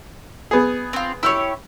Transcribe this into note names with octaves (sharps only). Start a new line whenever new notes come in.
B3 G#4
C4 F4
E4 G4 C#5 E6